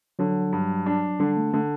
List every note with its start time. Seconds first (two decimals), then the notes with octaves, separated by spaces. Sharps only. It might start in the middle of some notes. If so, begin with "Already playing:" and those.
0.19 D3 F#3
0.53 G2
0.86 D4
1.20 D3 G3
1.37 A3
1.53 D3 A3